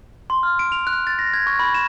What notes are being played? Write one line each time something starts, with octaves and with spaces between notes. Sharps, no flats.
C6
F6
D7
F7
F#6
A6
A#6
G#6
C#6
B5
E7